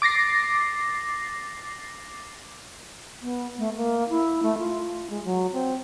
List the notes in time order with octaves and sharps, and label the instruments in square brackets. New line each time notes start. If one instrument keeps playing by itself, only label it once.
[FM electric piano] D6 A6 A#6 C7
[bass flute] B3
A3
A#3
E4
A3
F4
G#3
F#3
C4